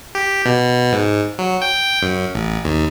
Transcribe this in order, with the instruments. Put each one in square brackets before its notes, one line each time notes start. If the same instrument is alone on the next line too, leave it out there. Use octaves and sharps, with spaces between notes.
[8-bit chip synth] G4
B2
G#2
F#3
G5
F#2
A1
D#2